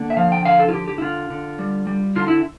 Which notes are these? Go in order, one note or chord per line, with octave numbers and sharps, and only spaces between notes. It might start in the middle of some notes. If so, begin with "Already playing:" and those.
Already playing: D3 A#3
E5
F3 F5
G5
D3 F5
A4
F4
D3 G4
G4
E4
D3 F4
D3
G3
G3
D3 F4
E4